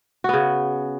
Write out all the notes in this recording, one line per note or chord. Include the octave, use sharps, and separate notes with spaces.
C#3 B3 F#4